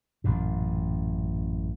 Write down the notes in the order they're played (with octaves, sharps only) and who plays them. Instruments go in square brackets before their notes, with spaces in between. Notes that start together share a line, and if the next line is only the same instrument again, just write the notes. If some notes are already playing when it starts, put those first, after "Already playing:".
[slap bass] A1 F#2 A#2